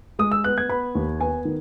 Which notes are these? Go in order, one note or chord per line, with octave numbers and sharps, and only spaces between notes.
G#3 D#6
E6
B3 F#6
G#6
B3 B5
D#2
B3 G#5
D#3